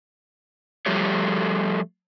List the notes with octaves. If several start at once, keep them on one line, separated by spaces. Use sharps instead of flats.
F3 G3 A3 F4 G4 C#5